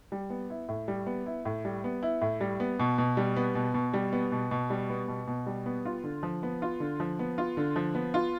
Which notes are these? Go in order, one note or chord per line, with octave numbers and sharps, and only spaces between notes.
G3
B3
E4
A2
G3
B3
E4
A2
G3
B3
E4
A2
G3
B3
B2
B2
G3
B3
B2
B2
G3
B3
B2
B2
G3
B3
B2
B2
G3
B3
F4
D3
F3
B3
F4
D3
F3
B3
F4
D3
F3
B3
F4